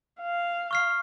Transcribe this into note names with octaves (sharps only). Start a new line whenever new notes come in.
F5
C#6 F6 C7